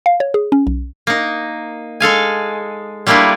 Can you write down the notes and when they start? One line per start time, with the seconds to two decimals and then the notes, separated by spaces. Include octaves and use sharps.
0.06 F5
0.20 C#5
0.34 G#4
0.52 C#4
0.67 B1
1.07 A#3 D#4
2.00 G#3 A4 F5 G#5
3.07 G3 A3 A#3 D4 E4 F4